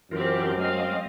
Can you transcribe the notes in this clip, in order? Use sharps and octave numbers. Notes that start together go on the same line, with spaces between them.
F#2 E3 C4 F4 G4 A#4
F#3 G#3 C4 D#5 F5